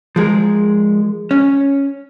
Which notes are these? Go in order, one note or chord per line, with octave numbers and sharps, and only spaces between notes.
F3 G#3 G#4 A#4
C#4